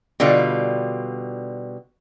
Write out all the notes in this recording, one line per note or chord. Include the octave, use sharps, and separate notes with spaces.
B2 D3 G3 F4